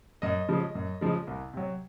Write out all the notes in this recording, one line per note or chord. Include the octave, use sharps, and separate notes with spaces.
F#2 D#5
C#3 F3 G#3
F#2
C#3 F3 G#3
C2
C3 F#3